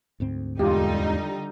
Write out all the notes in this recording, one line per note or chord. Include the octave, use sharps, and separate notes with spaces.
D2 G#2 C4
E2 D3 G3 G#3 D#4 F4 G4